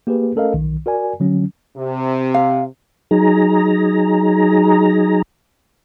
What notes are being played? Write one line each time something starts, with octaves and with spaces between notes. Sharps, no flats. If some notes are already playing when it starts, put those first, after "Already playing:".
A#3 G4 G#4 B4
A3 C#4 A4 A#4 D#5 F5
B1 D#3
F#4 A#4 D5 G#5
D3 F#3 C#4
C3
F5
F#3 D#4 G#4 A#5